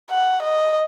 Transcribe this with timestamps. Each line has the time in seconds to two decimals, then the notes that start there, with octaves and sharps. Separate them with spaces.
0.10 F#5
0.43 D#5